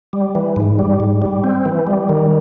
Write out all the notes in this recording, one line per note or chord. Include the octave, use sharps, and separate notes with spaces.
G3
E3
G#2
G3
G#2
G3
C4
E3
G3
D#3